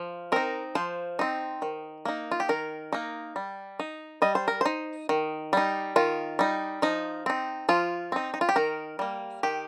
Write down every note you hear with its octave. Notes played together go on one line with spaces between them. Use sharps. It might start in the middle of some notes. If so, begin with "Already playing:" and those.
Already playing: F3
C4 D#4 A#4
F3 C5
C4 D#4
D#3
A#3 D#4
F4
G4
D#3 A#4
A#3 D#4
G3
D#4
G3 D#5
C5
A#4
D#4 C5
D#3
G3 D#4
D#3 F4
G3 D#4
F3 D#4
C4 D#4
F3 F4
C4 D#4
D#4
F4
G4
D#3 A#4
G3 A#3
D#3 G4